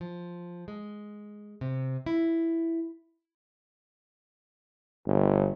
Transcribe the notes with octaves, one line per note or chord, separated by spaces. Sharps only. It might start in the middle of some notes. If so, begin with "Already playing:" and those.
F3
G#3
C3
E4
G1